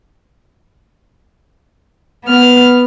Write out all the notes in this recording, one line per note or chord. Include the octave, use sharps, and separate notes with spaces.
B3 F6